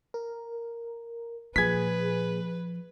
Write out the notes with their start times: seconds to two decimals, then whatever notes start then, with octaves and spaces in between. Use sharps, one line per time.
0.14 A#4
1.56 A#2 F3 G#4 B4 G#6 B6